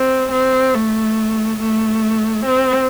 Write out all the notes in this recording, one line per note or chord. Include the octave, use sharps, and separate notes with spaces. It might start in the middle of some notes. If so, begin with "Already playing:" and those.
Already playing: C4
C4
A3
A3
C4